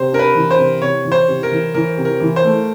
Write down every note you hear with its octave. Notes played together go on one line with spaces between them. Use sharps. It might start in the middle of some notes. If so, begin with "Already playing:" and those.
Already playing: C3 C5
D4 A#4
B4
E3
C5
C3
C3 C#5
E3
C5
C3
A#4
E3
E3 A#4
C3
A#4
E3
C5
A3